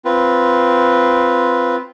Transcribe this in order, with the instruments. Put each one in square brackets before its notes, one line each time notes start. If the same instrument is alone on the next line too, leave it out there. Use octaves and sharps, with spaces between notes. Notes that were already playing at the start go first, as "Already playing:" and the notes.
[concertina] C4 F4 B4